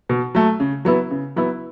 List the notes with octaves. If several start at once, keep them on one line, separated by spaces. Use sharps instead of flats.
B2
F#3 A3
C#3
F#3 B3 E4
C#3
F#3 B3 E4